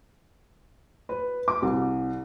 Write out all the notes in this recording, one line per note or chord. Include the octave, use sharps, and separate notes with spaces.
B4
D6
C2